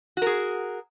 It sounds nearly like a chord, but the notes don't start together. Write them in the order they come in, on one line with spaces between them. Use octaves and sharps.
F#4 A#4 G#4